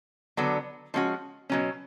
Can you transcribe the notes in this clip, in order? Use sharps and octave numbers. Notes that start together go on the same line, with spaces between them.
D3 F#3 B3 D4
F3 G#3 C#4 F#4
B2 F#3 C#4